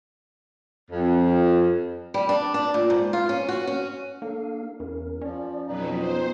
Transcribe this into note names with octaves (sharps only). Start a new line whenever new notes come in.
F2
G3
D4
D4
A#2
G#2
F4
C#4
F#4
C#4
A#3 D4 A4 F5
E2 C#4 A#4
F3 C#4 D5
F2 B2 F#3 B3 D#4
B3 F4 C5